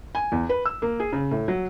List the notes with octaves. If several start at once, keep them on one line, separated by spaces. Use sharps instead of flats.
G#5
E2
B4
E6
A#3
G#4
C#3
A2
F#3